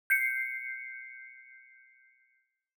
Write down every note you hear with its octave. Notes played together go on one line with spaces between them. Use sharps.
G6 C7 C#7